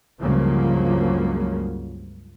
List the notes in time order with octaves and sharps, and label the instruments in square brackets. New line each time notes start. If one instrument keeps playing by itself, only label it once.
[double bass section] C#2 G2 C#3 F3 F#3 A#3